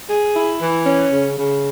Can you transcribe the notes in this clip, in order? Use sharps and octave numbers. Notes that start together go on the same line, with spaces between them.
G#4
E4
E3
C#4
C#3
C#3